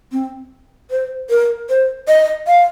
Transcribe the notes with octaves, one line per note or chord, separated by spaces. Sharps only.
C4
C5
A#4
C5
D#5
F5